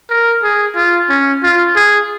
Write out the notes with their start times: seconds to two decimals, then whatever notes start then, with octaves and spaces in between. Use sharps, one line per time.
0.09 A#4
0.43 G#4
0.76 F4
1.09 C#4
1.43 F4
1.76 G#4